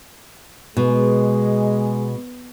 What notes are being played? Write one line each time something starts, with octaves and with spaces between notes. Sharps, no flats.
B2 G#3